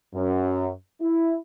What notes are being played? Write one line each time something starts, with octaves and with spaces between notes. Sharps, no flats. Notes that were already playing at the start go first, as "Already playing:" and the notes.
F#2
E4